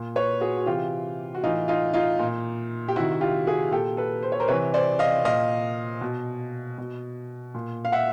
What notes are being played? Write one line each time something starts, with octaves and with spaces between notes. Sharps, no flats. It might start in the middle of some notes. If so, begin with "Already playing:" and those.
Already playing: A#2
B4 C#5
F#4 G#4
F#4
C3 E3 F4 G4
F#4
A2 E3 D#4 F4
D#4 F4
D#4 F4
A#2
G4
C3 D#3 E4 F#4
F#4
F4 G4
F#4 G#4
A#2 G4 A4
A4 B4
C5
C#5
A#4 C5
C3 E3 B4 C#5
C5 D5
D#5 F5
A#2 D#5 F5
B2
B2
A#2
F5
E5 F#5